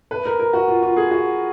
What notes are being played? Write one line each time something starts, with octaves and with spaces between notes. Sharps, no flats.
B4
A#4
A#4
F#4
F4
F4
G#4
F#4